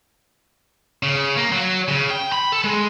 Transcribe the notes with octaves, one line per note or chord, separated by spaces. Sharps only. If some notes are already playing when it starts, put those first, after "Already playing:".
C#3
A#3
F#3
C#3
G5
B5
A4
G#3